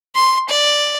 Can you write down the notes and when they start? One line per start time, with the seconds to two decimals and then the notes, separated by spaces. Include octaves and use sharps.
0.15 C6
0.49 D5